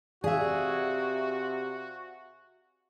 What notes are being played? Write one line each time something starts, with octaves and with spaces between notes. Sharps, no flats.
C3 F#4 G#4 D5 E5 F5